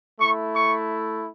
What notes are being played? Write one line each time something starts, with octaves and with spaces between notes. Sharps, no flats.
A3 E4 C#6
C#6